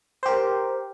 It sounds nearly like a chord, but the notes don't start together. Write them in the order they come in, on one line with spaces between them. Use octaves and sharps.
C5 G4 A#4